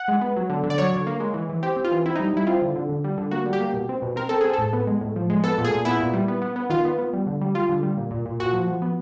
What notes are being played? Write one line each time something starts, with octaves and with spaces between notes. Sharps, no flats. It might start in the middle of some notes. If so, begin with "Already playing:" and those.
Already playing: F#5
G#3
B3
F#3
D3
D3
D5
F#3 C#5
D3
A#3
G#3
E3
E3
C4 G4
C4
F4
E3
C4 E4
G3 D#4
G3 E4
C4 F4
D3
D3
D3
G3
D3
A#3 F#4
G3
G4
A#3
B2
C4
B2
C4 A#4
C4 A4
C4 G#4
A2 A4
B3
G#3
A2
F3
G#3
B3 A4
A#2
G#4
A#2
B3 E4
A#2
G3
B3
B3
B3
D#3 F4
B3
B3
G3
D3
G3
G3 F4
D3
G3
A#2
A#2
A#2
A#2 F#4
F3
F3
B3